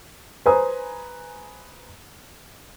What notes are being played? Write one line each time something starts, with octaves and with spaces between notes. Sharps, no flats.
B4 C5 G#5 A#5 D#6